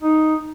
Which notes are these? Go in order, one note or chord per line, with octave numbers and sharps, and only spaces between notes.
D#4